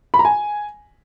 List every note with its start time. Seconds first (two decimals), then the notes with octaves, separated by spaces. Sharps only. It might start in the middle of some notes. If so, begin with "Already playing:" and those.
0.14 B5
0.19 A#5
0.25 G#5